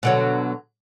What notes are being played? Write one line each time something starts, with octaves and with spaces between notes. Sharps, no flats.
B2 D3 F#3